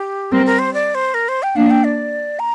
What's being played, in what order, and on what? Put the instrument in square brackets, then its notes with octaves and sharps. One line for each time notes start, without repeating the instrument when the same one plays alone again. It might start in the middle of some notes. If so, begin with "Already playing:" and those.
Already playing: [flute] G4
[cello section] G3 C4 [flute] A#4
[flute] A#4
C5
D5
C5
A#4
C5
G5
[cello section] A#3 D4 [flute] F5
[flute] G5
D5
A#5